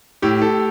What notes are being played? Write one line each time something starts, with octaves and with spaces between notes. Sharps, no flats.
A2 G4
A2 A4